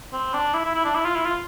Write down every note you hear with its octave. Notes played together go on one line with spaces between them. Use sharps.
C4
D4
E4
E4
E4
D4
E4
F4
E4
F4